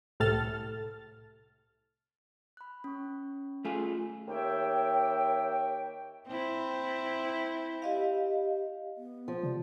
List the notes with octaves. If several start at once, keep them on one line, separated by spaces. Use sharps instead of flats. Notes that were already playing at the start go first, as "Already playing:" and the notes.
C2 A2 A4 F6 A6
B5 F#6
C#4 C#6
A3 F4 G#4
D#2 G4 C#5 E5 G5
C4 E4
G4 D#5 F5
B3
F3
C3 D5